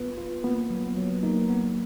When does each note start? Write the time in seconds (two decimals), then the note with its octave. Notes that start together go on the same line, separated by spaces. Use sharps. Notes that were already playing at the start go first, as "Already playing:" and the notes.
Already playing: B3 F4 B4
0.18 F4
0.44 A#3 B3
0.70 F#3
0.97 F#3
1.23 A#3 D#4
1.49 B3